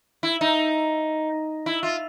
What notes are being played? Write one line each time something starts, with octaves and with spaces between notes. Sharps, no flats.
E4
D#4
E4
F4